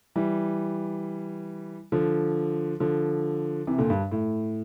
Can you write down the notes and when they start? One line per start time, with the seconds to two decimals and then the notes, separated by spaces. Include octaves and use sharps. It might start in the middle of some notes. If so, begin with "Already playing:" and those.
0.16 E3 G3
1.92 D3 F3
2.80 D3 F3
3.67 C3 E3
3.78 A#2 D3
3.90 G2
4.12 A2